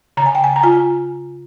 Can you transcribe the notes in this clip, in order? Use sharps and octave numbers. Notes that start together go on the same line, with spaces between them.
C#3 A#5
G#5
G5
G#5
A#5
F4 G#5